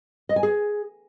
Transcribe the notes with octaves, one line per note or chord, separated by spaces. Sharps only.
D#5
G#5
G#4